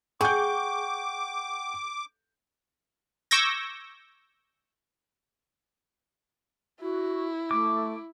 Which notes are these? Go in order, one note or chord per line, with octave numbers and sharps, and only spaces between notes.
G#4 F#5 G5 C#6 D6 G6
C#6 D6 E6 G6 G#6 A#6
E4 F#4
A3 D6